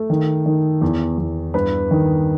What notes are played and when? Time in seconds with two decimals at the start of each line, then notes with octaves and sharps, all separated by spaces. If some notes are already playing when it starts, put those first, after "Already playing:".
Already playing: A3
0.10 D#3
0.46 D#3
0.81 E2
1.18 E2
1.54 G2 B4
1.91 D#3